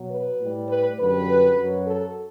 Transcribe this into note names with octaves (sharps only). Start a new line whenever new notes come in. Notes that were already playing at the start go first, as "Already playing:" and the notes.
Already playing: B2 F#3
B4
A2 G3
B4
F#2 D3 G3 B4
F#2 F#3
A4